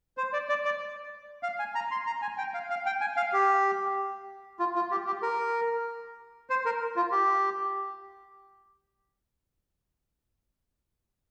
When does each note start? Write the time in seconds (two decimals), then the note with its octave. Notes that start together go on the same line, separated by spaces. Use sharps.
0.17 C5
0.33 D5
0.49 D5
0.65 D5
1.43 F5
1.59 G#5
1.75 A#5
1.91 C6
2.07 A#5
2.22 G#5
2.38 G5
2.54 F5
2.70 F5
2.86 G5
3.01 G#5
3.17 F5
3.33 G4
4.59 F4
4.76 F4
4.91 G4
5.07 G4
5.22 A#4
6.50 C5
6.66 A#4
6.96 F4
7.12 G4